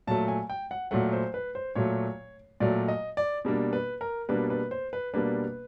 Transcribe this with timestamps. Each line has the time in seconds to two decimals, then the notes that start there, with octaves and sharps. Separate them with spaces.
0.07 A#2 F#3 A3 A5
0.28 G#5
0.50 G5
0.71 F#5
0.91 A#2 F#3 A3 F#5
1.13 C5
1.34 B4
1.55 C5
1.75 A#2 F#3 A3 C#5
2.60 A#2 F#3 A3 D5
2.88 D#5
3.17 D5
3.45 B2 G3 A#3 D4
3.73 B4
4.01 A#4
4.29 B2 G3 A#3 D4 B4
4.50 B4
4.71 C5
4.93 B4
5.14 B2 G3 A#3 D4 B4